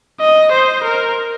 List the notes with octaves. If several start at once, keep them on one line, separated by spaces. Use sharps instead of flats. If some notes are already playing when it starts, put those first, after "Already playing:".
D#5
C5
A#4